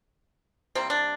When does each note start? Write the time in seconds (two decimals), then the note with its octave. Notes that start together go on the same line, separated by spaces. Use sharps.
0.75 C3 G3 A#3 C4
0.90 D4